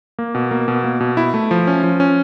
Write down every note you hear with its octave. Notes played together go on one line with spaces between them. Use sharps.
A#3
B2
A#3
B2
A#3
B2
E4
A3
F3
C#4
F3
C#4